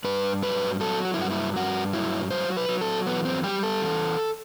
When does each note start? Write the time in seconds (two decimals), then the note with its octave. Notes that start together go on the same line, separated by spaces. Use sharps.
0.04 G2 B4
0.43 F#3 B4
0.80 F#3 A4
1.05 F#4
1.14 E4
1.18 G2 F#4
1.31 E4
1.56 G2 F#4
1.93 F#3 E4
2.30 F#3 C5
2.57 B4
2.69 F#3
2.81 A4
3.06 E2 B3
3.25 C4
3.44 G3 G4
3.63 A4
3.82 E2